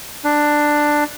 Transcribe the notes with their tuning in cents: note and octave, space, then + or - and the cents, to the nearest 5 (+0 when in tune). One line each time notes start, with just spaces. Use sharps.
D4 +10